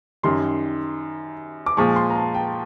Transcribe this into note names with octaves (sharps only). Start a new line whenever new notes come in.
F#2 D#3 G3 C6
D6
A#2 F3 G#3 C#6
C6
A#5
A5
G5